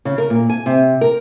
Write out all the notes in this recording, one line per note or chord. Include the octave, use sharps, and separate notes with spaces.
C#3
A#4
A#2
G#5
C3
A#4